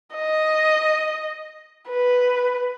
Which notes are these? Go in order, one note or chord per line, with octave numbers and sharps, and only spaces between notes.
D#5
B4